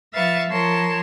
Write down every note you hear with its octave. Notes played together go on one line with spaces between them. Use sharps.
F3 B4 E5 F5 C#6 A6
F3 A#4 C#5 A5 C6